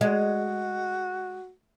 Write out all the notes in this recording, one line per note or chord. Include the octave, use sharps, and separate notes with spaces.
G#3 F#4